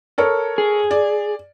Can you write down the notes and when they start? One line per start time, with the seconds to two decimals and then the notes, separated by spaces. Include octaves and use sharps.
0.18 A4 A#4 C#5
0.58 G#4
0.91 D5